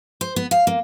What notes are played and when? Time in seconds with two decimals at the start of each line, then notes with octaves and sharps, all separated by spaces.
0.21 C5
0.36 B3
0.51 F5
0.67 A#3